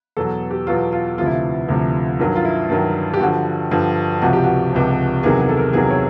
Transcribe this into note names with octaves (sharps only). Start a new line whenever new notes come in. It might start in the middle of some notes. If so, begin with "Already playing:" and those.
E2 B2 F#3 A4
G4
E2 B2 F#3 F4
F4
D2 C3 F3 F4
E4
F4
D2 C3 F3
G2 D#3 F#3
F4
E4
G2 D#3 F#3
G4
G2 D3 F3 F#4
G2 D3 F3
C#2 C3 F3 F#4
G4
F#4
C#2 C3 F3
E2 C3 D#3 F#3 G#4
G#4
A4
A#4
E2 C3 D#3 F#3 G#4
C#5